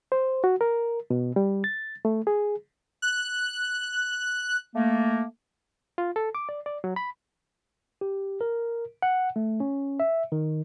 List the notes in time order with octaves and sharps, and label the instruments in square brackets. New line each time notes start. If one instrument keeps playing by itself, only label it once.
[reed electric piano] C5
F#4
A#4
B2
G3
A6
A3
G#4
[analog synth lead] F#6
[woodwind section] A3 A#3
[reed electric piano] F4
A4
D6
D5
D5
F#3
B5
[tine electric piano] G4
A#4
F#5
A3
C#4
E5
D#3